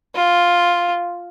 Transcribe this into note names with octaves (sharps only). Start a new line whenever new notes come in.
F4